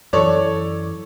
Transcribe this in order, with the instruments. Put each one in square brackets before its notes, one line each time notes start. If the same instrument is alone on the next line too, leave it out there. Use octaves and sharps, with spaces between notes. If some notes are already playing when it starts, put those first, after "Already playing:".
[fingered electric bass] F#2 E3 [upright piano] A4 C#5 D5